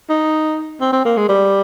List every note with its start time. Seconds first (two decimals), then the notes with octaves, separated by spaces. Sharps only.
0.09 D#4
0.80 C4
0.92 C4
1.05 A#3
1.17 G#3
1.29 G3